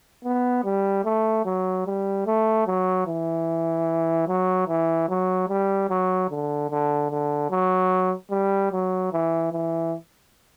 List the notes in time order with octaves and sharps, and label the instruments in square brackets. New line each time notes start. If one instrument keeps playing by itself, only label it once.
[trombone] B3
G3
A3
F#3
G3
A3
F#3
E3
F#3
E3
F#3
G3
F#3
D3
D3
D3
F#3
G3
F#3
E3
E3